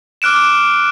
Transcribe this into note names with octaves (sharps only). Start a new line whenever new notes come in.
D6 F6 F#6 D7 E7